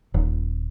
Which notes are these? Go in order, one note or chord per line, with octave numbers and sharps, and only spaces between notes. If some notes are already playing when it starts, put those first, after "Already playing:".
D#1